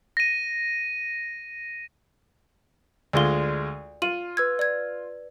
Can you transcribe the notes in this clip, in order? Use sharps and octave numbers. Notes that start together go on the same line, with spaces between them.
A#6 D#7
D2 G#3 F4 D5 G7
F4 D#7 F#7
B4 E6 G#6
D5 G#6